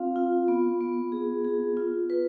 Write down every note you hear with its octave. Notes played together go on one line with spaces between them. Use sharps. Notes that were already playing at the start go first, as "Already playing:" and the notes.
Already playing: C4 F4 F5
F4
B3
B3
G#4
G#4
F4
B4